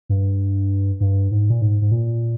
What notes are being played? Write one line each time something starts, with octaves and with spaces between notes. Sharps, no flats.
G2
G2
G#2
A#2
G#2
G#2
A#2